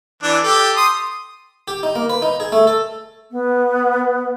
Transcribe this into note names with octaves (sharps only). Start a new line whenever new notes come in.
E3 D4
G4 A4
C6 D#6
G4
D#4
A#3
B4
D#4
G#4
A3
A4
B3